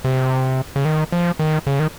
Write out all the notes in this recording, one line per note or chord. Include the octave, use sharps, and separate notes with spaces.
C3
C#3
D#3
F3
D#3
C#3
D#3